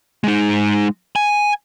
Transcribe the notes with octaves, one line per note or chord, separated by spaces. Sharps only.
G#3 D#4
G#5